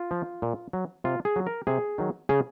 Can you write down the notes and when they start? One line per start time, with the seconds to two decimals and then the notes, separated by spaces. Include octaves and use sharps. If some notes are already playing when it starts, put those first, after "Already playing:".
Already playing: F4
0.11 F3
0.42 A#2
0.73 F#3
1.04 C3 F4
1.25 G#4
1.36 F#3
1.47 A#4
1.67 C3 G#4
1.98 D#3 F#3
2.29 C#3 G#4